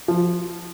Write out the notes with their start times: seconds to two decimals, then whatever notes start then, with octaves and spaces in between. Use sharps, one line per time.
0.08 F3